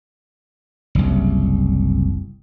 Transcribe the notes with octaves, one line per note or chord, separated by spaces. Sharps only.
F#1 C2